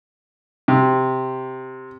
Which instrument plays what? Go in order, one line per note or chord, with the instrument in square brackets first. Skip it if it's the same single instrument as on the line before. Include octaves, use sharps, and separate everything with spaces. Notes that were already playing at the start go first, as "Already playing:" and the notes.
[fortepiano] C3